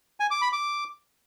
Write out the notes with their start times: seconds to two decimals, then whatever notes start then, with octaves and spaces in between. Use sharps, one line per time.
0.20 G#5
0.31 D6
0.42 B5
0.53 D6